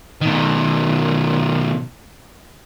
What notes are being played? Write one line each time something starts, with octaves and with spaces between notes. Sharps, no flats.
B2 D#3